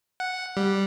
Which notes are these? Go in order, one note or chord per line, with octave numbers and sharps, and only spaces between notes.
F#5
G3